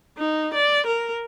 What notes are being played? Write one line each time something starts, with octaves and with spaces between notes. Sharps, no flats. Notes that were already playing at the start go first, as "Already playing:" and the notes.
D#4
D5
A#4